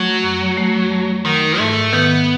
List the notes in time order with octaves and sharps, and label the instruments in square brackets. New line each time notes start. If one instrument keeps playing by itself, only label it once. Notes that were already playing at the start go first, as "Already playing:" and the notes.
Already playing: [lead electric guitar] F#3 [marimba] A3
[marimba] F#2
A3
A3
[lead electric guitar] D#3 [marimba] F#3
[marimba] G#2 [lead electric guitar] A3
[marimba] D#3 [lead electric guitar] B3